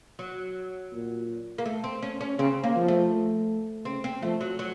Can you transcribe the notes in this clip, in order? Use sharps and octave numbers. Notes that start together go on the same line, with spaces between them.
F#3
A#2
A#3
A3
C4
C#4
C#4
C#3 C4
A#3
F3
A3
C#3 C4
C4
F3 A3
F#3
F#3